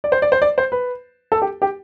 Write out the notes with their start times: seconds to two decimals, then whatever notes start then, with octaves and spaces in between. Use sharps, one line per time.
0.04 D5
0.12 C5
0.22 D5
0.32 C5
0.42 D5
0.58 C5
0.72 B4
1.32 A4
1.42 G4
1.62 G4